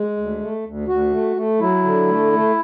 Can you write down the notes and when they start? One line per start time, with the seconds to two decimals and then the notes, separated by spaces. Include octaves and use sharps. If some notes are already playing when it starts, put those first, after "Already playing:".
Already playing: G#3
0.17 D2
0.41 A3
0.64 D2
0.88 D2 F#4
1.12 A3
1.36 A3
1.60 F#3 E4
1.84 D3
2.08 A3
2.32 A3